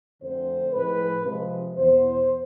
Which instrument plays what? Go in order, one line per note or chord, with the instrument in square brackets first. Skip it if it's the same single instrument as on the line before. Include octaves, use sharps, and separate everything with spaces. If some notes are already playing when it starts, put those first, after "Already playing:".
[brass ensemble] F2 D3 A3 C4 C5
A2 F3 G#3 C4 B4
C3 F3 G#3
E2 B2 B3 C5